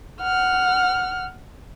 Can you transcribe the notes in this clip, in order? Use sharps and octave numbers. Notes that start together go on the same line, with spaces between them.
F#5 F6